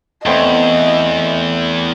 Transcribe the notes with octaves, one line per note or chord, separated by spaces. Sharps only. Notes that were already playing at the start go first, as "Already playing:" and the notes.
E2 A3 B3 C4 D#5